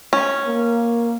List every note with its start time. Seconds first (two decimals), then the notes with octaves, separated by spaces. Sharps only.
0.13 C#4
0.46 A#3